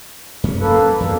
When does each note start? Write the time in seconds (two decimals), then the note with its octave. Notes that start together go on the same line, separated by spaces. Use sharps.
0.44 F#2 C#4
0.61 A#3 A4 B4
1.00 E2 G2 B2 A#3 A4